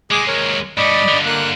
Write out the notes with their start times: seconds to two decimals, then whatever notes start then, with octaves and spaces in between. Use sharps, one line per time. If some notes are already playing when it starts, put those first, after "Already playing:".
0.11 D#2 G#3 G#4 D6
0.28 A#4 C#5
0.77 G2 A3 D5 D#5 B5
1.08 G2 D3
1.26 A#3 F#6